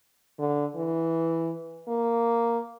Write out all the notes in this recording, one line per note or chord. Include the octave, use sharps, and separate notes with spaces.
D3
E3
A#3